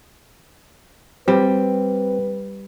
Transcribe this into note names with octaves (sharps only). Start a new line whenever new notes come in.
G3 C4 B4